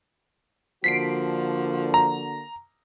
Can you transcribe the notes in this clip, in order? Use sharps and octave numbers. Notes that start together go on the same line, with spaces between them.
D3 F3 A#3 F#4 B6 C7 D7
A#5